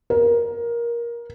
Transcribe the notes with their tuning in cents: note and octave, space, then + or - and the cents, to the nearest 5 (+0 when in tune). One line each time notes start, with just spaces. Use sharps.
A#4 +15